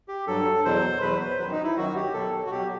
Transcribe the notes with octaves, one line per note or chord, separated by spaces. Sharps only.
G4
G2 F#3 A4
E2 B2 F#3 C5
E2 B2 F#3 B4
C5
F#2 D#3 F#3 B4
D#4
E4
F#2 D#3 F#3 F#4
G4
B2 F#3 A4
F#4
B2 F#3 G4